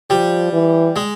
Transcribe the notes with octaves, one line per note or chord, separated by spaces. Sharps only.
F3 G3
E3
G#3